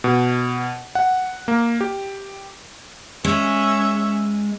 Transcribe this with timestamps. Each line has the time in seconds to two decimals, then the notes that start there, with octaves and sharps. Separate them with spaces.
0.04 B2
0.95 F#5
1.48 A#3
1.81 G4
3.25 G#3 C#4 E5